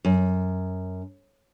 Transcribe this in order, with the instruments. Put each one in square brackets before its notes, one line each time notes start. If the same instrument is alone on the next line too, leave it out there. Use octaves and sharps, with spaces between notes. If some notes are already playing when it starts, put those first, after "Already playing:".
[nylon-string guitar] F#2